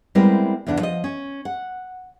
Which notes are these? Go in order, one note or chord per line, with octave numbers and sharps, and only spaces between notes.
G3 G#3 B3 C4 E4 A#4
E2 C#3 D4 F#5
F3 D#5
C#4
F#5